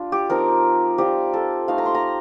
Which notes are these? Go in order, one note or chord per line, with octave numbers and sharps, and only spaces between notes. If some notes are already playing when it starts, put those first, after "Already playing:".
Already playing: G3 D4 F4
G4
F3 C4 D#4 A#4
G3 C4 F4 G4
A4
A3 D#4 F5
A#5
C6
A#5